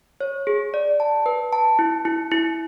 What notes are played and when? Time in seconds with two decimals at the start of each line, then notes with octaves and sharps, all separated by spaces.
0.21 C#5
0.47 G#4
0.74 D5
1.00 A5
1.26 B4
1.53 A5
1.79 E4
2.05 E4
2.31 E4